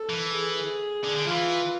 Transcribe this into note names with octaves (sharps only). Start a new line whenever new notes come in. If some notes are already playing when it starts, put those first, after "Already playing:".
Already playing: A4
E3
G#4
D3
D3
E3 F4